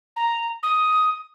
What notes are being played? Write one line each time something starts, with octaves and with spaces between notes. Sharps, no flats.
A#5
D#6